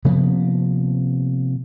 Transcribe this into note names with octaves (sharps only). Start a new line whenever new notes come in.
C3 F3 A#3 B3